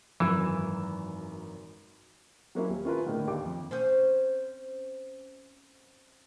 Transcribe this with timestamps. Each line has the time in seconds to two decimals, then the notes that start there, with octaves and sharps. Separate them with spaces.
0.20 G#1 F#2 E3 E7
2.55 F#3 A#3 C#4 E4
2.69 D#1
2.85 C#4 E4 F4 A#4 B4
3.06 A2 D3 D#3 A#3
3.27 D#2 D6
3.45 F2
3.71 C4 C#4 C5